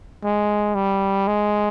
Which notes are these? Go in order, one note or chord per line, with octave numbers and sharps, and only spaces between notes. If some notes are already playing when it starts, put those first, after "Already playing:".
G#3
G3
G#3